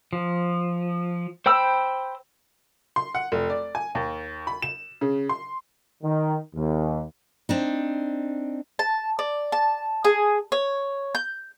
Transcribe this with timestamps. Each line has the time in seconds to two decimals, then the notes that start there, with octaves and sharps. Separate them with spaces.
0.13 F3
1.46 C5 G5 B5 E6
2.96 C6
3.15 F#5
3.32 F1
3.50 D5
3.75 G#5
3.95 D#2
4.47 B5
4.62 E7
5.01 C#3
5.29 C6
6.03 D#3
6.55 D#2
7.49 C4 D4 D#4
8.79 A5
9.19 D5
9.52 A5
10.05 G#4
10.52 C#5
11.15 G6